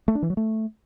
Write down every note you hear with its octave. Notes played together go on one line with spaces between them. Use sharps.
A3
D4
E3
F#3
A3